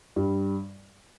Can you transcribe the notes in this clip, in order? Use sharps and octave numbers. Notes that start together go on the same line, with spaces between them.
G2 G3